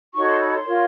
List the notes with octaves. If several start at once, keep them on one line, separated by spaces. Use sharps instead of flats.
D#4 F#4 A4 C#5 C#6
C6
B5
C6
F4 A#4 C#5